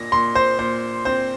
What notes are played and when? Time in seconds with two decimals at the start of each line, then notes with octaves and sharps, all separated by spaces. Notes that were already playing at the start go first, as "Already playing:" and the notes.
Already playing: A#2 A#6
0.12 A#2 C6
0.35 C5
0.59 A#2 C5
1.05 C4 C5